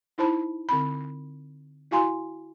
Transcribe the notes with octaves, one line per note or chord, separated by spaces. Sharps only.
D#4 E4 C5 A5 B5
D3 C4 B5
E4 F#4 F5 G#5 A#5 C6